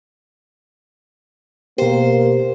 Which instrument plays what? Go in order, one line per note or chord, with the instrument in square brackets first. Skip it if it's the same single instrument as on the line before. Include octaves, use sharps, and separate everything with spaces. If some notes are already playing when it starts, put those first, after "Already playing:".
[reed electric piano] B2 G4 [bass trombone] A#3 [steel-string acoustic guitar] C5